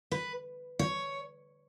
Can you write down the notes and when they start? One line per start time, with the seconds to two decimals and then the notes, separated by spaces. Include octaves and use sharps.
0.12 B4
0.79 C#5